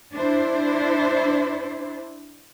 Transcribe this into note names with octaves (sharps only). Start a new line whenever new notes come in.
D4 E4 C5